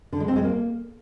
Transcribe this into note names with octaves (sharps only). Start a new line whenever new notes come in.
D3
G#3
C4
G#3
A#3